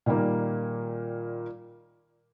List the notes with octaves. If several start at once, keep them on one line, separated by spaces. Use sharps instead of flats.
A#2 D#3 G3 A#3